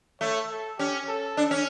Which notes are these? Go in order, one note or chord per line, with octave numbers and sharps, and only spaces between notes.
A3 C#5
A4
C#4 G4
A4
D4
C#4